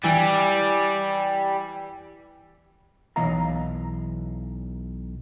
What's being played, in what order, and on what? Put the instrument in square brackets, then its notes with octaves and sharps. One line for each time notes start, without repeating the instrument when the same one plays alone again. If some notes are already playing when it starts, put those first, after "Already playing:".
[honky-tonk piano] E3 [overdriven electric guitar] G3
[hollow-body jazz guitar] B1 E3 D#5 F5 A#5